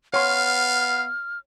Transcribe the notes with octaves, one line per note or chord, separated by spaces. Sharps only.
B3 C#5 F5 C6 F6